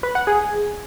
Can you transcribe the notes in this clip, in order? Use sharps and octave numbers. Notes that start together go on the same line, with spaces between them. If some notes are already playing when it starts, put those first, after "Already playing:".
B4
F#5
G#4